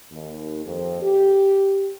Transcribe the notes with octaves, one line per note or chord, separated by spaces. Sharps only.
D#2
F2
G4